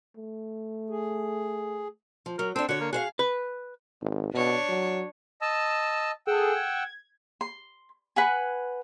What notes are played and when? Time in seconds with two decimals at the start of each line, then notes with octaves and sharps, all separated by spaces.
0.17 A3
0.90 G#4
2.26 F3
2.39 F#3 A#4
2.56 C4 D4 A4
2.69 D3 F#4 C#5
2.81 A#3
2.93 F#4 G#4 C5 F5
3.19 B4
4.01 G#1
4.34 B2 D4 C#5
4.69 F#3
5.41 D#5 A5 E6
6.27 G#4 A4 F#5 G5 E6
6.55 G#6
7.41 C6
8.16 B4 F#5 G#5